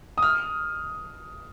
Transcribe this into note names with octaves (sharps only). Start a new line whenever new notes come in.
D#6
F6